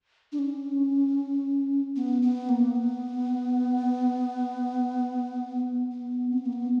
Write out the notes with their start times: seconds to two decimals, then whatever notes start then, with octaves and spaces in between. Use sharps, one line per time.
0.32 D4
0.39 C#4
1.96 B3
2.22 B3
2.49 A#3
2.76 B3
5.91 B3
6.31 C4
6.38 B3
6.46 A#3
6.53 B3